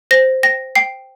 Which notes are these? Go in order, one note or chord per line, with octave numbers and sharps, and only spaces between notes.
C5 A#6
G5 A#6
G5 C7